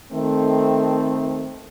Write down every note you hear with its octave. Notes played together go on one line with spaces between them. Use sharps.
D#3 A3 C4